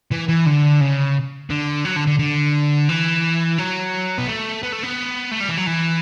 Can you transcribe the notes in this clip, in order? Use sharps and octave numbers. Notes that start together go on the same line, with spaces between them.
E3
E3
D3
C#3
D3
F#3
D3
D3
D3
E3
F#3
B3
A3
B3
A3
B3
A3
G3
E3
F#3
E3